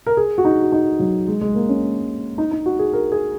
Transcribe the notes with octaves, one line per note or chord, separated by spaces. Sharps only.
A#4
G#4
F#4
D#4
F#4
D#4
F#3
G#3
G#3
A#3
C#4
D#4
D#4
F#4
G#4
A#4
G#4